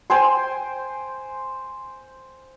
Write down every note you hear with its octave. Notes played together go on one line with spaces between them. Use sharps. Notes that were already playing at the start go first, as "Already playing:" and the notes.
C5 G5 G#5 C6